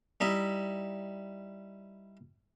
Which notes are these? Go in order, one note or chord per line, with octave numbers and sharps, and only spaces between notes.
G3 D#4 E4